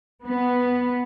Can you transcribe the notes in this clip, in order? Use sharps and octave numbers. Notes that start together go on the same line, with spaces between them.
B3